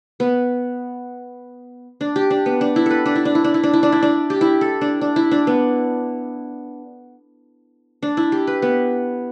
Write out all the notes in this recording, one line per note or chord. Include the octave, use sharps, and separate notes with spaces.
B3
D4
G4
D4
B3
D4
E4
A4 B4
D4
E4
D4
E4
D4
E4
D4
E4
D4
E4
D4
G4
E4
A4
D4
D4
E4
D4
B3
D4
E4
G4
B4
B3